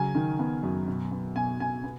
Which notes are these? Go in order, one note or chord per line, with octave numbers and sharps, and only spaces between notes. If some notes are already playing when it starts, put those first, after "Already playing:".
Already playing: C#3 F#3 G#5
D#3
B3
F#2
B2
B3
B2 G#5
B2 G#5
B3